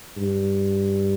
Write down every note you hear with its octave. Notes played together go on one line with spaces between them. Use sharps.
G2